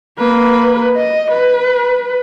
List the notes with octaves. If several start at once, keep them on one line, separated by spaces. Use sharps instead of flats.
A#3 B4
D#5
B4